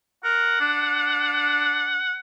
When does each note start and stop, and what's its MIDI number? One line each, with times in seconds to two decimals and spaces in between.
0.24 0.57 70
0.24 2.19 78
0.60 2.00 62